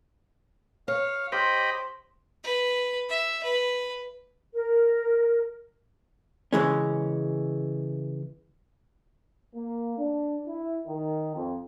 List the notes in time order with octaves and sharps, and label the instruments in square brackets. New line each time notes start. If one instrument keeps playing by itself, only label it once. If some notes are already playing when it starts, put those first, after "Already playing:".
[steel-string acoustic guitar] C#5 [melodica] F5
[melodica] G4 [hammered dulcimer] C5 [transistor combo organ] D#5 G5 B5
[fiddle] B4
E5
B4
[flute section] A#4
[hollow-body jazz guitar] C#3 E3 G#3 C#4
[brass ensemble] A#3
D4
E4
D#3
F2